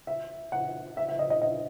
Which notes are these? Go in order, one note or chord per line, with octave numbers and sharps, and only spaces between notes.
E5
F#5
E5
E5
D#5
D#5
D#5